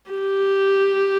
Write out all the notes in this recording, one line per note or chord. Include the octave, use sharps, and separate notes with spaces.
G4